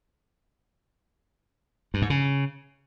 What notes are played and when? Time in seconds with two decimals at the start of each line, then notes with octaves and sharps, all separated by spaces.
1.94 G2
2.02 G#2
2.10 C#3